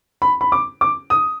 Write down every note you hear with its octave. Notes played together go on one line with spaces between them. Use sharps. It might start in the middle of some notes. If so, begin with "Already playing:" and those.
B5
B5
D6
D6
D#6